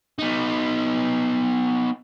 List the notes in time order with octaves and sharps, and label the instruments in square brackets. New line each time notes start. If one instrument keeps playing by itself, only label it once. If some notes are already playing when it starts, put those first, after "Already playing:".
[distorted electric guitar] B3 D#4